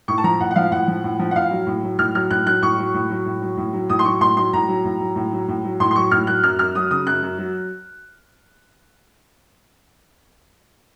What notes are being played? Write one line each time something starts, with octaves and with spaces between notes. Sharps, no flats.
A2 C#6
A5
F3 A#5
A2 F#5
F#5
F3 F5
A2 F#5
F3
A2
F3
F#5
A2 F5
F#3
A2
F#3
A2 F6
F#3 F6
A2 F#6
F#3 F#6
A2 C#6
F#3
A2
F#3
A2
F#3
A2
F#3
A2 D#6
C6
F#3 C#6
A2 C6
F#3 C6
A2 A#5
F#3
A2
F#3
A2
F#3
A2
F#3
A2 C6
C6
F#3 C#6
A2 F6
F#3 F#6
F#2 F6
F#2 F6
F#3 D#6
C#3 D#6
F#2 F#6
F#2
F#3